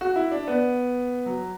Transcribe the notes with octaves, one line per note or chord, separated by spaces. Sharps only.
F#4
E4
D4
B3
F#3